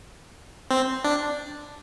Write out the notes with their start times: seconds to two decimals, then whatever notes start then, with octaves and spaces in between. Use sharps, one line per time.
0.71 C4
1.04 D4